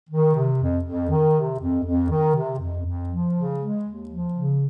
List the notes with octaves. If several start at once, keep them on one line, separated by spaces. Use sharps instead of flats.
D#3
C3
F2
F2
D#3
C3
F2
F2
D#3
C3
F2
F2
F3
C#3
G#3
D#2
F3
C#3